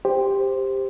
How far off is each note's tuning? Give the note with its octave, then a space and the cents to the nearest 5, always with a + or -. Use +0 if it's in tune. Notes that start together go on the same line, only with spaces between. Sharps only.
G4 +10 C5 +0